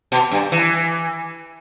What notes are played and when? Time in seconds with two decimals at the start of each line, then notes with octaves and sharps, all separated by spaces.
0.12 B2
0.31 G2
0.52 E3